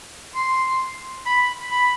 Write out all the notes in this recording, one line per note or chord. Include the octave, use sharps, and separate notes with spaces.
C6
B5
B5